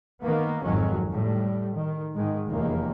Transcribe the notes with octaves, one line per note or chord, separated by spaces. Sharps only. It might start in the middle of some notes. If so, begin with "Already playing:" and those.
D#3 A#3 B3
G#1 F2 D#3 F#3 C#4
A2 G3
D#3
G#2 D#3 G#3
F1 E2 D#3 A#3